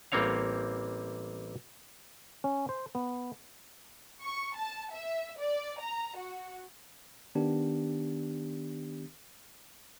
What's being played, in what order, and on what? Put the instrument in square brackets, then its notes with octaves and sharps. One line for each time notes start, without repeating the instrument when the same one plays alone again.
[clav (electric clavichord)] A1 G3 A#3 C4 C#5 F5
C#4
C5
B3
[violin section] C#6
A5
E5
D5
A#5
F#4
[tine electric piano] D#3 B3 D4 G4